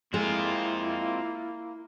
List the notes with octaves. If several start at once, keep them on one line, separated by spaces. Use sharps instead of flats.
G#3 A#3 C4 E4 F4